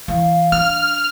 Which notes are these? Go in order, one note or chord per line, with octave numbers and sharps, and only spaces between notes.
E3 F5
D4 F6